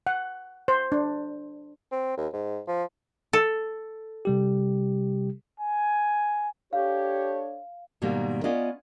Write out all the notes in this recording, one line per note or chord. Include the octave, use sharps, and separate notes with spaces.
F#5
C5
D4
C4
D#2
G#2
F3
A4
C3 G3 G4
G#5
D4 G4 A4 C#5 F5
G#2 B2 D#3 G3 A#3
B3 C#4 F4 D5 D#5